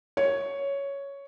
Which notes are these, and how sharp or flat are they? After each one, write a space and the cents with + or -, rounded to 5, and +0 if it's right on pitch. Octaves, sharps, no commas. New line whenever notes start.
C#5 +5